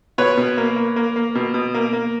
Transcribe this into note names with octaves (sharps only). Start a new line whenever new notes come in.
B2 B4 C#5
B2
A#3
A#3
A#3
A#3
B2
B2
A#3
A#3